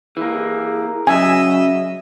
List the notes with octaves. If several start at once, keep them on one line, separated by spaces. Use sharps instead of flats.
E3 A#3 G#4
C#3 F#3 D#5 E5 G#5